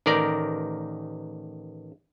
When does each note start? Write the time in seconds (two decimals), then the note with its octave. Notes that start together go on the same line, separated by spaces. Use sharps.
0.06 A1 D#3 A#4 D5